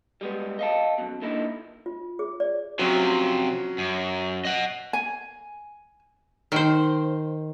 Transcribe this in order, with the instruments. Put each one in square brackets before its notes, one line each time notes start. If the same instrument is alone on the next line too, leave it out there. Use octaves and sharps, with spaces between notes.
[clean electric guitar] G3 G#3 B3
D#5 F5 A5
F#2 B2
A#2 D3 D#4 E4
[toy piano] F4
G#4
D5
[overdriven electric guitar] C3 F3 [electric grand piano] F#3 C#4
[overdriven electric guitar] F#2
D#5 F#5
[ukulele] G#5
[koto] D#3 C5